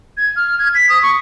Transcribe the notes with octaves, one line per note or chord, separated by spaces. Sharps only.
G#6
F6
G#6
B6
D#6
C#6